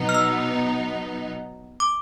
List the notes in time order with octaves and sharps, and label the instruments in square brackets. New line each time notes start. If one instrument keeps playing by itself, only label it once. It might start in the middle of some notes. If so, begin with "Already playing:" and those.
Already playing: [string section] B2 F#3 B3 D#4
[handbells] F6
E6
D6